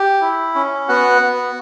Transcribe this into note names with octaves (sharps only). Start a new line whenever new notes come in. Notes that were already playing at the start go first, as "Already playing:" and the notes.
Already playing: G4
E4
C#4
B3 F#4 F#5
B3